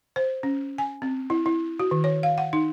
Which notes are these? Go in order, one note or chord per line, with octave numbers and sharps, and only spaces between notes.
C5
C#4
G#5
C4
E4
E4
F#4
D#3
C#5
F5
F#5
D#4